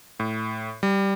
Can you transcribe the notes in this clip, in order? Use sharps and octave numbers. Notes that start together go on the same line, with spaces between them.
A2
G3